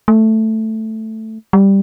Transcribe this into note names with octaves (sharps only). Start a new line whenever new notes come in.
A3
G3